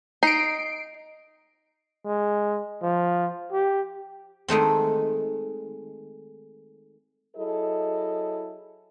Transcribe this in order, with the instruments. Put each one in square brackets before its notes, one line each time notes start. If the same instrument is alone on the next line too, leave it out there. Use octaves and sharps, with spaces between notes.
[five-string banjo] D#4 [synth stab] C7 D7
[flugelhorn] G#3
F3
G4
[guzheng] D#3 G#3 A3 C4
[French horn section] F#3 E4 G#4 A4 D#5